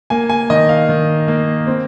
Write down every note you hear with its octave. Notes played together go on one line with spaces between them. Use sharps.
A#3 G#5
G#5
D#3 D#5
F5
D#3
A#3
C4